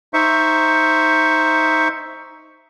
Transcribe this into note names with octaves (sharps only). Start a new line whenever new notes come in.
D#4 C5 E5 C#6